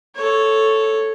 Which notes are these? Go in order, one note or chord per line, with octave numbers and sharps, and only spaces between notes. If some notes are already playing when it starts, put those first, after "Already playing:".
A4 C#5